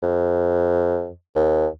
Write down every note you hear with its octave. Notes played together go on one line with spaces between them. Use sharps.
F2
D#2